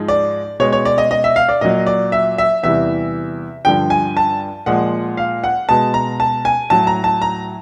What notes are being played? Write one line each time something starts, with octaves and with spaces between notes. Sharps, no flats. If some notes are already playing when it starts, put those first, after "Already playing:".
Already playing: G#2 F3 G#3
D5
B2 G#3 C#5
C#5
D5
D#5
D#5
E5
F5
D5
A#2 F#3 D#5
D5
E5
E5
E2 C3 E3 G3 E5
G2 D3 F3 G5
G#5
A5
A#2 F3 G#3 F#5
F5
F#5
B2 G#3 A5
A#5
A5
G#5
A2 F#3 A5
A#5
A5
A#5